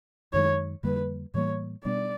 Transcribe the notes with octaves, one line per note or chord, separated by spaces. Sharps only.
F#2 D#3 G#3 C#5
F2 D3 G3 A#3 B4
A2 E3 G3 A#3 C#5
B2 G3 B3 D4 D5